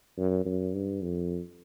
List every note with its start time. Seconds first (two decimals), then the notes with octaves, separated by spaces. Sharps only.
0.18 F#2
0.46 F#2
0.74 G2
1.02 F2